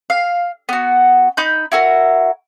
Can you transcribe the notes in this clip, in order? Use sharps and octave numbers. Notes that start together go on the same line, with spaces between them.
F5
B3 F#4
D#4 B5 G6
E4 F#4 A#4